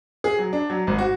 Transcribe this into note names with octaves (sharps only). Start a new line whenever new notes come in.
G#4
F#3
D4
F#3
G#1
F#4